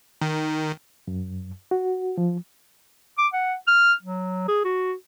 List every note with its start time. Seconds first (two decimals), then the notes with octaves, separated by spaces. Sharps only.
0.21 D#3
1.08 F#2
1.71 F#4
2.18 F3
3.18 D6
3.33 F#5
3.68 F6
4.03 F#3
4.48 G#4
4.64 F#4